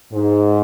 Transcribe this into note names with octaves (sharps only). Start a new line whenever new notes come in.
G#2